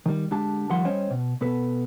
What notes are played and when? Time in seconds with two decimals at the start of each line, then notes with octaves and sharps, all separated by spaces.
0.06 D#3 G3
0.31 D3 G#3 G4 A5
0.69 D#2 D#3 F3 G3 F#5 C6
0.85 G3 C#4 C5 C#5 D#5 G5
1.10 B2
1.41 B2 B3 A4 B4